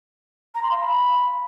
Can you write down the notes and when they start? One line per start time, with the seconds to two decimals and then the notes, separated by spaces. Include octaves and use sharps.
0.55 A#5
0.63 C6
0.71 F5
0.79 B5